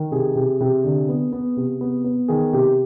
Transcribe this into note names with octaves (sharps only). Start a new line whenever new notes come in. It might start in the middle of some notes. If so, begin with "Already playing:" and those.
Already playing: D#3
C3 G#4
C3
C3
D3
B3
B3
C3
B3
B3
D#3 G#4
C3 G4